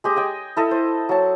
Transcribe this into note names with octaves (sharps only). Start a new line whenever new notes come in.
G#3 G4 D#5
D#5 G5 G#5
E4 A4 D#5
C5
F#3 A5